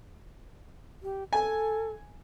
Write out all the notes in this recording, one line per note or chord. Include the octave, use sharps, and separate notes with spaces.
G4
A4 G#5